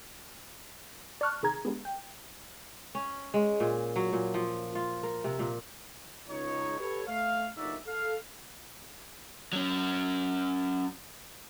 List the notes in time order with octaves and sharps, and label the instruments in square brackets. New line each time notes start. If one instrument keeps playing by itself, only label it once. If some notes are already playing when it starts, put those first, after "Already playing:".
[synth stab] D5 A5 C#6 F6 F#6
C3 D#3 G#4 A#5 G#6
D3 G3 G#3 B3
G5
[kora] C#4
G#3
A#2
F#3
A#2
F3
F4
A#4
C3
A#2
[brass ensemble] C#2 D#4 C#5
G4 A4 B4 C#5
A3 F5
G1 A#3 D#4 F#4 D5 E5
A4 F5
[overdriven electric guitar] F#3 C#4